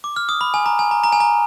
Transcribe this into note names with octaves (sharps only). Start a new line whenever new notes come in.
D6
F6
D#6
B5
G#5
A#5
G#5
A#5
A#5
G#5
A#5